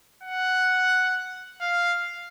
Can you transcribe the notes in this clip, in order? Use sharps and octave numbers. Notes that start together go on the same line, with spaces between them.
F#5
F5